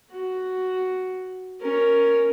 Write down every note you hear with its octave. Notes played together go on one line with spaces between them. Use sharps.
F#4
C#4 A#4